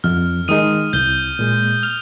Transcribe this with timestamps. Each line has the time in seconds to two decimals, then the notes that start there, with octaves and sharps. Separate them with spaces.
0.04 F2 F6
0.48 D#3 G#3 D#4 D#6 D#7
0.93 C2 G6 G7
1.39 A#2 G#3
1.83 F6 F7